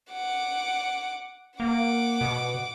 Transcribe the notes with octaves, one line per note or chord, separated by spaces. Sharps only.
F#5 D6
A#3 F#5 D6
B2